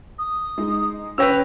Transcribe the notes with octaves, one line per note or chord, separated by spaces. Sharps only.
D#6
G#3 D#4
C#3 B4 C#5 G5 E6 A#6 F7